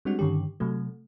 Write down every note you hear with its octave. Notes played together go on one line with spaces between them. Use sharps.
G3 G#3 C4 D4 F#4
G2 D3 D#3 C#4 G4
C3 F#3 A3